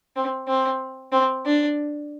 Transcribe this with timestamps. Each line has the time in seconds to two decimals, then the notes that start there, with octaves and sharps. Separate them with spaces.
0.16 C4
0.48 C4
1.12 C4
1.45 D4